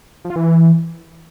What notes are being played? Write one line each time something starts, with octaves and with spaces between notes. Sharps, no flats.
F3
F4
E3